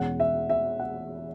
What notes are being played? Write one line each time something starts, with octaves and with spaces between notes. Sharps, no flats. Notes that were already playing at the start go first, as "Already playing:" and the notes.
Already playing: E2 B2 G#3 C#4 F#5
E5
E5
F#5